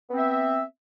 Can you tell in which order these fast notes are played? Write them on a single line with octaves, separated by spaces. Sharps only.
B3 C4 E5